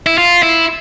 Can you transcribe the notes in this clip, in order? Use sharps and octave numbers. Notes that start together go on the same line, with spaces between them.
E4
F4
E4